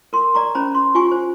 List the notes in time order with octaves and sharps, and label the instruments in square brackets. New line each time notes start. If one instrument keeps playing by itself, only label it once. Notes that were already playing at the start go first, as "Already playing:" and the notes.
[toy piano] A#4 C6
D5 A#5 C#6
C#4 C5 A#5 B5
C6
F4 G4 G#5 C#6
C5